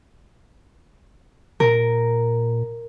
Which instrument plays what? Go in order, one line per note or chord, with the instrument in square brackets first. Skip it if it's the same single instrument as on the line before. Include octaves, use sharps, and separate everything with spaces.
[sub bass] A#2 [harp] A#4